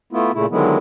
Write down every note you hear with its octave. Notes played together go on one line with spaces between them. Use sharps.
A3 B3 E4 F4
A#2 C#3 A3 E4
D3 D#3 F#3 G#3 B3 E4